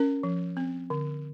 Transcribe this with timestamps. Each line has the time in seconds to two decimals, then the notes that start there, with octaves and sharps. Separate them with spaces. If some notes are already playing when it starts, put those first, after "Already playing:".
Already playing: C#4 A#4
0.23 F3
0.57 C4
0.90 D3